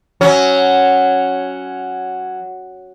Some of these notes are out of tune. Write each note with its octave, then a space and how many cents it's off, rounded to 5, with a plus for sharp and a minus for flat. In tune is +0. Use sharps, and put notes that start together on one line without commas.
F#3 +0 C#4 +0